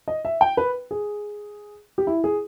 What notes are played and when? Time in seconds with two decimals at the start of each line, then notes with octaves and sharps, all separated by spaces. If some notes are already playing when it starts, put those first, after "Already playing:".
0.08 D#5
0.25 E5
0.41 G5
0.57 B4
0.91 G#4
1.98 G4
2.07 E4
2.24 G#4